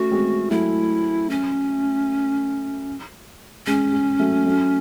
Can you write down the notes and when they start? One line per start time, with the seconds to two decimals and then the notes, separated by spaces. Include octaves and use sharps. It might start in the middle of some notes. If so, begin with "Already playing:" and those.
Already playing: A3 C#4 F#4
0.11 G#3 C4
0.51 F#3 A3 E4
1.30 C#4
3.67 G#3 C#4
3.93 G#3
4.19 F#3 A3
4.46 F#3 A3